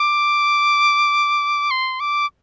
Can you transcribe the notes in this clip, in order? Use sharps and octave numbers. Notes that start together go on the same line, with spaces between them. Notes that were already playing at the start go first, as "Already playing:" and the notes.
Already playing: D6
C6
D6